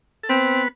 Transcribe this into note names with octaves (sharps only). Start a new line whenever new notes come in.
A4
B3 C4 B4